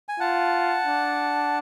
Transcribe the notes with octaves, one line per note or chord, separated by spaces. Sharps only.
G#5
F4 F#5 A5
D4